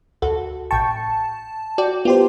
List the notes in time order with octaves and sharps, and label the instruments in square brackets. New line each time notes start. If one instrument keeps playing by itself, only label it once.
[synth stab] D2 F#4 A4
[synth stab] A1 G5 C#6 [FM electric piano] A5
[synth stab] F#4 D5 G5
[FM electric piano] B3 G4 C5 [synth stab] F4